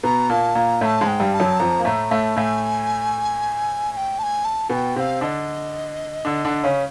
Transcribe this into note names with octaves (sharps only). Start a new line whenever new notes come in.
B2 B3 A#5
A#2 A#3 A5
A#2 A#3 A#5
A2 A3 A5 A#5
G#2 G#3
G5
G2 G3
A5
F#2 F#3
F2 F3 A#5
A#3
A2 A3 A#5
A2 A3 A5
A2 A3 G#5
G#5
G5
A5
G#5
A5
B2 B3 G#5
G5
C3 C4 F5 G5
D3 D4 D#5
D3 D4
D3 D4
C#3 C#4